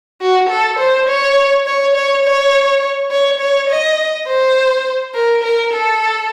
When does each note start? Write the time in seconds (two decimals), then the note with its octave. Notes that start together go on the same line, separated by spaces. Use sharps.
0.21 F#4
0.49 A4
0.79 C5
1.08 C#5
1.66 C#5
1.95 C#5
2.24 C#5
3.11 C#5
3.40 C#5
3.69 D#5
4.27 C5
5.14 A#4
5.43 A#4
5.73 A4